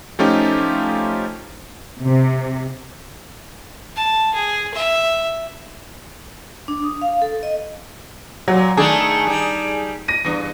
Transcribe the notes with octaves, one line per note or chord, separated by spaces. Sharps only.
F3 A3 C#4 D#4 F4 G4
C3
A5
G#4
E5
D4
D#6
F5
A4
D#5
A#2 F#3
D#3 A3 D4 G#4
G3 D#4
A#6 D#7
E2 G2